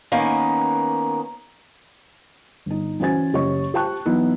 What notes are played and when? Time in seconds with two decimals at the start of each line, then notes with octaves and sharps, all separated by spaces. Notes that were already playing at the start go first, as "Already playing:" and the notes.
0.12 D#3 A#3 B3 C#4
2.66 G1 D#4
3.00 E3 C#4 F#4 C5 G#5 A6
3.33 F#1 G4 C#5 D#5 C#6
3.74 G4 C5 G5 A5 C#6 F#6
4.06 E3 F#3 B3 D#4 E4